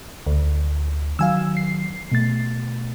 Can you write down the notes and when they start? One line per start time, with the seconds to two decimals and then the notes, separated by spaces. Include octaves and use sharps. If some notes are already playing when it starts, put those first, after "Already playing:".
0.27 D2
1.19 D#3 F#3 F5 G#5 E6
1.57 C7
2.11 B2 A3 A6